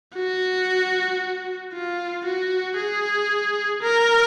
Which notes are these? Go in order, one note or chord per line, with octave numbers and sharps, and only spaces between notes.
F#4
F4
F#4
G#4
A#4